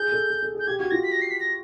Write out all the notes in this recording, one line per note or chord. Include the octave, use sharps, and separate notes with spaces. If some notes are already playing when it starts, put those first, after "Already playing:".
Already playing: G#4 G6
A4
G#4
A4
G#4 G6
G4 G#6
F#4 G#6
F4 A#6
B6
A#6
C7
B6
A#6